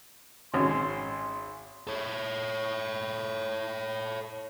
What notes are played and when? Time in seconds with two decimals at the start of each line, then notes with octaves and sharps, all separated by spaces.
0.54 G#1 C#4 C6
1.87 A4 C#5